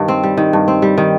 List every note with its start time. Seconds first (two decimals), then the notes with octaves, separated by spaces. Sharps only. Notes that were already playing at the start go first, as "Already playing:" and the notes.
Already playing: G2 D#3
0.08 C4
0.23 G3
0.37 D#3
0.53 G2
0.68 C4
0.82 G3
0.98 D#3